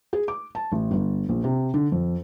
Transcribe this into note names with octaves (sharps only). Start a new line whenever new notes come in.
G#4
D6
A5
A1
G1
A#1
C3
D3
F2